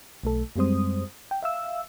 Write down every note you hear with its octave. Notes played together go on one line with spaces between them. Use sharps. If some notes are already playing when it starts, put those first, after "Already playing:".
B1 A3 A4
F#2 G3 G#3 C4 C5 D#6
G5
E5 F5 E6